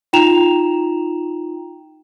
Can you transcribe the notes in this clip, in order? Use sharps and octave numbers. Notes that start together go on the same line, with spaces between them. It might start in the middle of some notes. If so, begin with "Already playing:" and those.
D#4 F4 G5 A#5 E7 F7